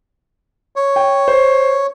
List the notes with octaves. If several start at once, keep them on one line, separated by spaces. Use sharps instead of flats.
C#5
G5
C5